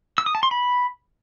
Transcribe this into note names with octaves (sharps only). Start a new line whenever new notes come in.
E6
D#6
A5
C6
B5